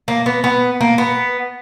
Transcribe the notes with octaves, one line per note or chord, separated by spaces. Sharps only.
A#3
B3
B3
A#3
B3